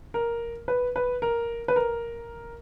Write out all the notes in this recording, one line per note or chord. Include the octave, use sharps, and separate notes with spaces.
A#4
B4
B4
A#4
B4
A#4